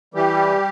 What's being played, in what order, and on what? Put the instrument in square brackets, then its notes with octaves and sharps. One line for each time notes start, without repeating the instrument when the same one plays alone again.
[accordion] E3 G3 G4